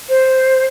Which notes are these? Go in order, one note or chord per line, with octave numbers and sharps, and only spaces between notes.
C5